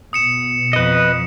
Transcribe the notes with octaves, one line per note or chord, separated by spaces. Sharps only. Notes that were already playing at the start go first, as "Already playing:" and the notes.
B2 D#6 C#7 E7
F2 B4 D#5